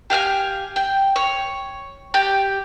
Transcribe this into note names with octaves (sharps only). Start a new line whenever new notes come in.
G4 F5 F#5 G#5
G5
C#5
G4